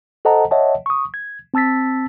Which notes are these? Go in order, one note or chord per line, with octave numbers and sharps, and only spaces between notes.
A4 C5 D#5 F#5 A5 A#5
C#5 D#5 E5 F#5 A5
C#6 D#6
G#6
C4 A5 E6 A6 B6